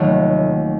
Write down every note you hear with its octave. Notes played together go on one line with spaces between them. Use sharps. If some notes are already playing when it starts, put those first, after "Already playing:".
Already playing: F1 D#2 D#3 F#3 A3